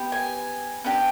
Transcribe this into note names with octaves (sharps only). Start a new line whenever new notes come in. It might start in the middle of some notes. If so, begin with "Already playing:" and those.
Already playing: B3 G4
G#5
B3 D4 G4